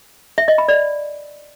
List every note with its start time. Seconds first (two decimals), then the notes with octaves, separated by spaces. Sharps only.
0.38 E5
0.48 D#5
0.58 B5
0.68 D5